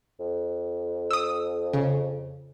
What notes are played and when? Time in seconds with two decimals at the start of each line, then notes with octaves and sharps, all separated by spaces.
0.19 F2
1.11 D#6 E6
1.73 C#3